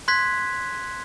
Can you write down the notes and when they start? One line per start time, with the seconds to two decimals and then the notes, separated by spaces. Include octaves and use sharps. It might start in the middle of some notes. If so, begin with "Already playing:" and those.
0.08 C6 F#6 G#6 B6